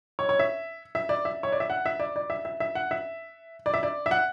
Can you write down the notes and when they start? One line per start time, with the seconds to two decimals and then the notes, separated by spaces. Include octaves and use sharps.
0.19 C#5
0.29 C#5
0.39 E5
0.95 E5
1.09 D5
1.25 E5
1.43 C#5
1.52 D5
1.60 E5
1.70 F#5
1.86 E5
2.00 D5
2.16 D5
2.30 E5
2.45 E5
2.60 E5
2.75 F#5
2.91 E5
3.66 D5
3.74 E5
3.83 D5
4.06 E5
4.11 F#5